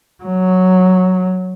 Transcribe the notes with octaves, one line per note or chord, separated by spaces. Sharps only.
F#3